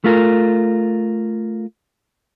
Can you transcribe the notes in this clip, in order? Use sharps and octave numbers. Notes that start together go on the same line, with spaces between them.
A3 F4 A#4